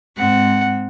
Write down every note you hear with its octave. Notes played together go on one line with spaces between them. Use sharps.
G#2 C4 F#5